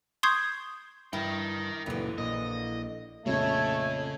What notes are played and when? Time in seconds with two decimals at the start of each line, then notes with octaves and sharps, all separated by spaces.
0.23 C6 C#6 D#6 G6 G#6 C7
1.13 G2 E4 A#4 G5
1.86 C#2 F#2 A#2 D3 E3
2.18 A#1 A#2 D#5
3.26 A#1 F2 C#3 A3 C#5